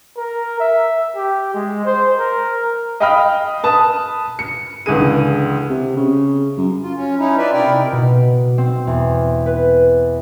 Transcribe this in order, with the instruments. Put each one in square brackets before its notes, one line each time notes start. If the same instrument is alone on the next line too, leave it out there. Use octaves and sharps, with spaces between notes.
[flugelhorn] A#4
E5
G4
G#3
C5
A#4
[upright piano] D#5 F5 G5 B5 D#6 F6
B4 A5 D#6
C#7
C#2 D3 E3 G#4 D#7
[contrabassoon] C3
C#3
F#2
[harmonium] F4
C#4
C#4 D#4 E4
F4 B4 D5 E5
C3 D#4 E4 A#4 D5 G5
[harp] B2
C4
E2
B4